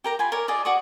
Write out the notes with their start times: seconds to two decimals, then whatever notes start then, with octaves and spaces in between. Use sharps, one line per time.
0.04 G4 A#4 A#5
0.19 F4 G#5 B5
0.32 A#4 C#5 D5
0.48 F4 G#4 D5 D#5
0.65 F#4 D5 C#6 D#6